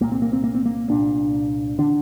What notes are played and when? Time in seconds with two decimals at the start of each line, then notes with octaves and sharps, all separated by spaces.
0.01 C2 A#2 A#3
0.12 C4
0.22 A#3
0.33 C4
0.44 A#3
0.55 C4
0.66 A#3
0.90 C2 A#2 D4
1.78 D3 D4